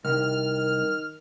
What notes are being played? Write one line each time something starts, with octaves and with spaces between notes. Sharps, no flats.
C2 D#3 F6